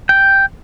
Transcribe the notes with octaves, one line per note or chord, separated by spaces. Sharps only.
G5